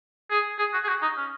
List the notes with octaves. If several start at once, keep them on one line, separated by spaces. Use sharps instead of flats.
G#4
G#4
F#4
G#4
F#4
D#4
C#4